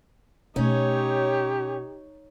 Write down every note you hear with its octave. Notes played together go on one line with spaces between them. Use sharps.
B2 A3 C#4 D#4 G4 C#5